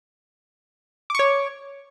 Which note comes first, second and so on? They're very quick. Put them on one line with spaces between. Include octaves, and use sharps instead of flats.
D6 C#6 C#5